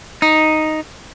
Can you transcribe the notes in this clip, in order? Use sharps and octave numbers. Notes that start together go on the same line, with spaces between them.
D#4